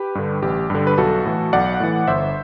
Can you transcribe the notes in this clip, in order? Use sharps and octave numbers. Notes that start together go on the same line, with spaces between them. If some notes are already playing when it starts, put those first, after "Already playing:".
Already playing: G4 B4
G2 D3
A1 G4
G2 D3
B4
B1 F#4 A4
A2 E3
B1 D5 F#5
A2 E3
G1 C5 E5